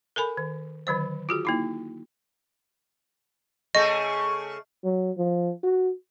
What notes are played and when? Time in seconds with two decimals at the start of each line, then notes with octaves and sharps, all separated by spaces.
0.16 A4 A#4 G#5 B5
0.37 D#3
0.87 D3 D#3 F#3 C5
1.29 F4 F#4 G#4
1.45 A#3 D#4 E4
3.75 C#3 A3 G#4 D#5 C#6
4.84 F#3
5.18 F3
5.63 F#4